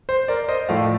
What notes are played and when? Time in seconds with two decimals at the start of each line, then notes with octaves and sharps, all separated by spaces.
0.09 C5
0.28 A#4 D5
0.48 C5 D#5
0.69 A2 F3 A3 D5 F5